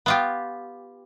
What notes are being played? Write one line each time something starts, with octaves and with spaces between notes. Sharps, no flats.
B3 F4 G4